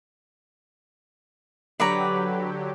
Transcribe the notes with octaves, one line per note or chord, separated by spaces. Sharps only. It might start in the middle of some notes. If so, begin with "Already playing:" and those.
D3 F#3 G4 B4 C#5 D5 A#5